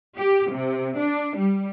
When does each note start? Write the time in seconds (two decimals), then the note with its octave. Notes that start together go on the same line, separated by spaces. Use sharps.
0.16 G4
0.50 C3
0.99 D4
1.37 G3